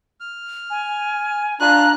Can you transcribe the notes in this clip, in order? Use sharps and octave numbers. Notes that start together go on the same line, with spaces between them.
F6
G#5
D4 F4 A#5 F#6